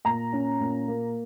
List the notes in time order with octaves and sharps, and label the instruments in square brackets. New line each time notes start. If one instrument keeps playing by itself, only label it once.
[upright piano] A#2 A#5
C#4
A#2
A#3